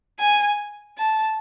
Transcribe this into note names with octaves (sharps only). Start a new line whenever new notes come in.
G#5
A5